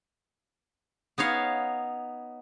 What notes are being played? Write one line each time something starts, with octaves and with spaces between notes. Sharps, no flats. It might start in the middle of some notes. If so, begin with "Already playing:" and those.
B3 D#4 C#5 F5